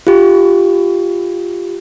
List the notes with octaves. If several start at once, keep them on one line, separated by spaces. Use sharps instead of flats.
F4 G4